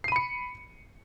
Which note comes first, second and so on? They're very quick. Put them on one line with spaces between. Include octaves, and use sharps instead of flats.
C7 D#7 B5 C#7